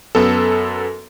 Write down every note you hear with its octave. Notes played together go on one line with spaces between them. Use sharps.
F#2 B3 A4